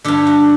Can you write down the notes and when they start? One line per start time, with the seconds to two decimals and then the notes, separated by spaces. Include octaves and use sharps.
0.04 G2 D3 G4
0.27 F#4